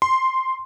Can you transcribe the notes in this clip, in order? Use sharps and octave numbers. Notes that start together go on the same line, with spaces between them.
C6